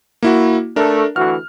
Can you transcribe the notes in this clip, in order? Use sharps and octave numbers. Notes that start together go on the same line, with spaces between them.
A#3 E4 F#4
A3 D4 A#4
D2 E3 F#4 F6